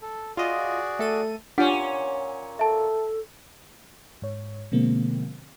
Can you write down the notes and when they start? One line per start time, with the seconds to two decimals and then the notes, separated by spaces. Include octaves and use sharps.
0.01 A4
0.37 F4 F#4 G#4 D5 D#5
0.99 A3 A4 D#7
1.58 A#2 C#4 D4 F4 G4 F#5
2.59 A4 E5 A5
4.22 G#2 C#5
4.72 B2 D3 F3 G#3 A#3 C4